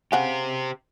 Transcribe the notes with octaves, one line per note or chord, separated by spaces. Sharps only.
C#3 G4 C5 F#5 G#5